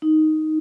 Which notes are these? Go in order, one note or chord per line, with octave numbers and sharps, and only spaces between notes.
D#4